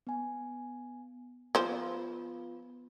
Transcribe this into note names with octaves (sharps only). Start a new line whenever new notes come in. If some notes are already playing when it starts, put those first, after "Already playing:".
B3 G#5
F3 B3 F4 B4 C5